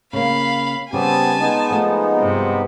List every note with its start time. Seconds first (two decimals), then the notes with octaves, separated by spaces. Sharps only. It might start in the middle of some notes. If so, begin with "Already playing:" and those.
0.13 C#3 A#3 F5 B5
0.93 C#3 G3 B3 C4 G4 G#5 A5
1.40 G#3 B3 D#4
1.70 F3 A3
2.17 G2 C3